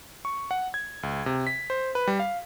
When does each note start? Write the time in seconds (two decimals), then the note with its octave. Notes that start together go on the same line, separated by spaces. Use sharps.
0.25 C#6
0.51 F#5
0.74 G#6
1.03 C#2
1.26 C3
1.47 B6
1.70 C5
1.95 B4
2.07 G3
2.19 F5